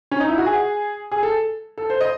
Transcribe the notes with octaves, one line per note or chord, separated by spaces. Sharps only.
C#4
D#4
E4
F#4
G#4
G#4
A4
A4
C5
D#5